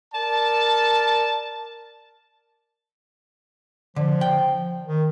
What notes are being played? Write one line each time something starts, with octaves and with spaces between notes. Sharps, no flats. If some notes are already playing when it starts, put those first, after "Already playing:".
A#4 D5 A5
D3 F3
G5
D#3